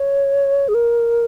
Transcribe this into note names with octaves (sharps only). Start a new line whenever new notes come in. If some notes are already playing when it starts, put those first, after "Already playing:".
Already playing: C#5
G#4
A#4